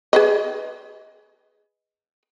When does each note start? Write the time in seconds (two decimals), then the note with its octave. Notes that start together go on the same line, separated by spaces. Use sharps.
0.13 G#4 B4 D#5